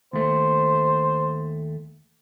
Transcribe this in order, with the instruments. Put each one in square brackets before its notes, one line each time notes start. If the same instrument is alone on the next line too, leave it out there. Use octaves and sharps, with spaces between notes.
[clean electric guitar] D#2 A3 [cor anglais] C5